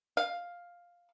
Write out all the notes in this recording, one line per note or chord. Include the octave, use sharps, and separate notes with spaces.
F5